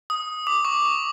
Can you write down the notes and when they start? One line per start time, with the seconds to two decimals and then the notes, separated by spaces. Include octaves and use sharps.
0.10 D#6
0.47 D6
0.65 C#6